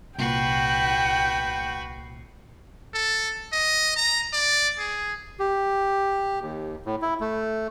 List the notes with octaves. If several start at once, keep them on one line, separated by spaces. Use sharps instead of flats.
C2 A#2 F#4 B4 G5 C7
A4
D#5
A#5
D5
G#4
G4
D#2
A2
E4
A3